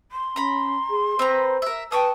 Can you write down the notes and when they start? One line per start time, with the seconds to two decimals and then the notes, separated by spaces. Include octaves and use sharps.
0.11 C6
0.36 C#4 A#5 B5
0.90 G#4
1.19 C4 B4 C5 A#5
1.62 A#4 E5
1.92 B4 G5 A5 C#6 D#6